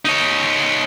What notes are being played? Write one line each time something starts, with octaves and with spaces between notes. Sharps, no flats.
D#4 C#5